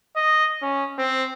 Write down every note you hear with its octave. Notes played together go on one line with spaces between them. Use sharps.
D#5
C#4
C4